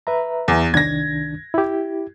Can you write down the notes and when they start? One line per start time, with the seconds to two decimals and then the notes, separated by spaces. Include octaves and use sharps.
0.07 B4 E5 A#5
0.48 E2
0.74 C2 D#3 D4 G#6 A#6
1.54 E4 G4